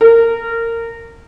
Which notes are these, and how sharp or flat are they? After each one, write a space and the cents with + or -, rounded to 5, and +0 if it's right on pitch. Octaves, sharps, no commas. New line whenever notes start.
A#4 -25